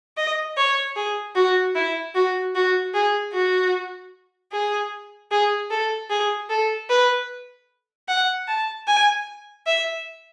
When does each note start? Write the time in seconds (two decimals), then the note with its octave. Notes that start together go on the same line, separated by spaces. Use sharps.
0.17 D#5
0.57 C#5
0.96 G#4
1.36 F#4
1.75 E4
2.15 F#4
2.55 F#4
2.94 G#4
3.33 F#4
4.52 G#4
5.31 G#4
5.71 A4
6.10 G#4
6.50 A4
6.90 B4
8.08 F#5
8.48 A5
8.88 G#5
9.67 E5